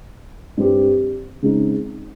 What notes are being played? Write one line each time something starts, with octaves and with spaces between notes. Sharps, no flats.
G2 G3 C4 G4
C#3 G#3 C4 D#4